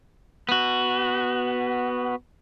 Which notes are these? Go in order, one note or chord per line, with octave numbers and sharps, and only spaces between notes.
B3 F#4